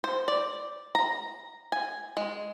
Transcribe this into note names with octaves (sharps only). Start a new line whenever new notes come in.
C5
D5
A#5
G#5
G#3